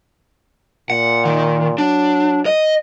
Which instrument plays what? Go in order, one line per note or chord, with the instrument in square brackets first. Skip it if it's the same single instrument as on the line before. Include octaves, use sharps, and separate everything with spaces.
[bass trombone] A#2 [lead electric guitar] F#5
[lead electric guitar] D#3
[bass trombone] F#3 [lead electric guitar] D4
[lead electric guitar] D#5